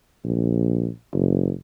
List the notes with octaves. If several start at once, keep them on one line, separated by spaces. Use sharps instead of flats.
A#1
F#1